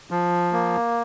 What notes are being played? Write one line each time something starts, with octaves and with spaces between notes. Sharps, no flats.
F3
A#3